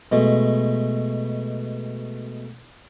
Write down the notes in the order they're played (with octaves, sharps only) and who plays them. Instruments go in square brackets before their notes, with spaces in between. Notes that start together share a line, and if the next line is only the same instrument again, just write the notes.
[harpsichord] B2 G#3 A3